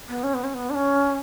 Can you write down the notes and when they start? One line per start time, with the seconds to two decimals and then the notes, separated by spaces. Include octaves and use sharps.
0.09 B3
0.24 C#4
0.34 B3
0.44 C#4
0.54 B3
0.70 D4
0.75 C#4